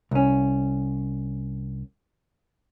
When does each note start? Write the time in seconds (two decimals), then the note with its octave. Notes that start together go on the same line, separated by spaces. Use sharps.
0.11 C2 C#4